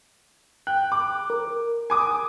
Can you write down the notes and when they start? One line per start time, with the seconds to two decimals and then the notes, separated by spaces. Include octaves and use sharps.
0.67 G5 F#6
0.92 D6
1.30 A#4
1.90 G#5 D6 D#6